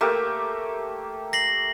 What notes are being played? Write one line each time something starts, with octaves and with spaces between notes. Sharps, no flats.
A3 A#3 G4
A#6 C7 F#7